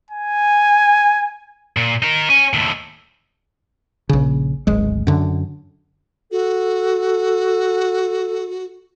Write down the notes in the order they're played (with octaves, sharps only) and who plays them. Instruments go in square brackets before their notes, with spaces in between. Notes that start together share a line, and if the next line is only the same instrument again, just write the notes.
[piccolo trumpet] G#5
[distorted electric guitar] A#2
D#4 A#4
C#4 G#5
D#2 A2
[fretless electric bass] A#1 C#3
D1 G#1 G#3
F#2 D3
[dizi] F#4 [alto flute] A4